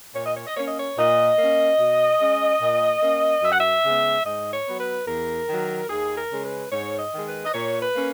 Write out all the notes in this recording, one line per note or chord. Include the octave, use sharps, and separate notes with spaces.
A#2 C#5
D#5
C#5
D#5
A#3 C#4 C#5
D#5
C#5
A#2 D#5
A#3 C#4
B2
G#3 C#4
A#2
A#3 C#4
F#2 E5
F#5
E5
C#3 G#3 B3
G#2 D#5
C#5
F#3 B3
B4
E2 A#4
D#3 F#3
D#2 G#4
A#4
C#3 G#3 C#4
B4
G#2 C#5
D#5
D#3 G#3
B4
D#5
A#2 C#5
B4
A#3 C#4